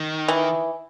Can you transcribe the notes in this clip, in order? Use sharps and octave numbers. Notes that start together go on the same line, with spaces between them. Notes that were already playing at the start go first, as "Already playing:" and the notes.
Already playing: D#3
E3